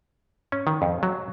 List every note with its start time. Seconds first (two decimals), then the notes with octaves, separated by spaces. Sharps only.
0.52 C#4
0.67 D#3
0.82 F2
1.03 F#3